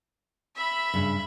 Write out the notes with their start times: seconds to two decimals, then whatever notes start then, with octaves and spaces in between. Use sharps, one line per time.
0.56 E5 B5
0.94 G2 C#3